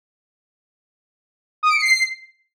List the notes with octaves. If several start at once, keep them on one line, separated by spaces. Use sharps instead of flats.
D#6
D7
C#7
C7